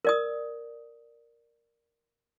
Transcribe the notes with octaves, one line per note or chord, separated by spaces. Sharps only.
A#4 D5 D#6